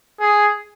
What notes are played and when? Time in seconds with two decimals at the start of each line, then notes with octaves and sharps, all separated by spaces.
0.20 G#4